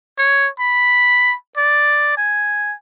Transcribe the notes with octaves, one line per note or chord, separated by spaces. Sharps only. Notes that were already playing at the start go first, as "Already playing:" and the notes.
C#5
B5
D5
G#5